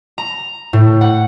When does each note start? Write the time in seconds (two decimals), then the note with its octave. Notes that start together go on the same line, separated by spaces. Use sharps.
0.18 A#5
0.73 A2
1.01 F#5